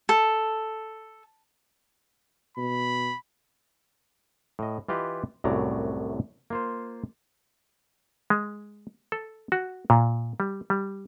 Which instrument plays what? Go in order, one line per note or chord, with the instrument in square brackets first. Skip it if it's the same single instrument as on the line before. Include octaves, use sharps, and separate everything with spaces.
[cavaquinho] A4
[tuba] B2 [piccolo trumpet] B5
[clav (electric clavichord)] A2 D#5
E3 F4 G4 B4 D#5
C2 F#2 A2 F#3 D5 A#5
A#3 F4 C5
G#3
A4
F#4
A#2
G3
G3